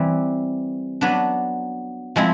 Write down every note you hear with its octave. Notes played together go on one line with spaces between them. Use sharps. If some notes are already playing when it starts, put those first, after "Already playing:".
Already playing: E3 G3 C4
F#3 B3 D4
F3 G#3 C4 E4